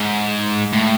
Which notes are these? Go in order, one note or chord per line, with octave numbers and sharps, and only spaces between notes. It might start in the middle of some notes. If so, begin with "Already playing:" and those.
Already playing: G#2
A2